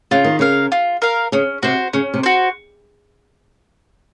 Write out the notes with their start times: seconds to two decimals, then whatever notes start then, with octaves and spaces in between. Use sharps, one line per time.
0.11 C#3 F4
0.24 D#3
0.39 C#3 A#4 F5
0.72 F4
1.02 A#4 F5
1.32 C#3 C#4
1.63 C3 F#4 C5
1.93 C#3 C#4
2.14 C3
2.23 F#4 C5